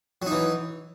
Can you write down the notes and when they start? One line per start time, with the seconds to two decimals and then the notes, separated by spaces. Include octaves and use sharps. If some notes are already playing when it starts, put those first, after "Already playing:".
0.22 F#3
0.26 D#4
0.31 E3